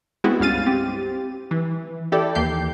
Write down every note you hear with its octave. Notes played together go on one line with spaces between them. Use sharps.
G#3 B3 C4 E4 F#4
C#2 G2 C#4 F5 A6 D#7
C4 G4
E3
E4 G4 A4 D5
D#2 E3 G4 G6 C7